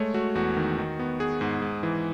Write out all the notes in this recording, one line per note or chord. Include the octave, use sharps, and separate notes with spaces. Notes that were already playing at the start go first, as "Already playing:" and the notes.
Already playing: G#3 A3 C#5
A3 F#4
E2 F#4
D#3
D#3
B3
B3 G#4
G#2
G#2
E3